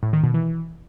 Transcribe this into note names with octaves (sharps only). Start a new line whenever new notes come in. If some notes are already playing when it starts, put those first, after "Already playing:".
A2
D#3
B2
E3